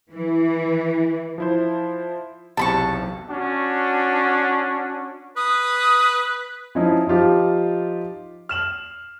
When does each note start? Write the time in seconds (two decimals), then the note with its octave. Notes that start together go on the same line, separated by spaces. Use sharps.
0.13 E3
1.38 F3 E4 C5
2.57 B1 E2 C3 A5 B5 C#6
3.30 C#4 D4 F#4
5.37 B4 D#6
6.75 F3 C#4 D#4 E4
7.07 F3 D#4 F4 G4
8.49 F6 E7 F#7